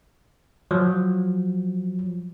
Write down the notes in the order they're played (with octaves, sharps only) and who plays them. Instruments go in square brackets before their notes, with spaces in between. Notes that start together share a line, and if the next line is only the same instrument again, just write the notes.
[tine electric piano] F3 F#3